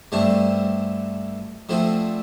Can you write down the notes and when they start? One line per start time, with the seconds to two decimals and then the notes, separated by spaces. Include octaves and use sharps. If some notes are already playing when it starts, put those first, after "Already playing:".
0.12 G2 D3 A3 C4 G4
1.69 D3 F3 A3 C4 F4